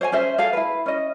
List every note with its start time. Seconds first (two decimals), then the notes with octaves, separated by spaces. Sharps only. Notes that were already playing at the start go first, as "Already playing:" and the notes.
0.01 C5 C#5 F#5 G#5
0.12 C#4 G#4 C5 E5
0.38 G#4 A4 F5
0.53 E4 B4
0.86 C#4 D#5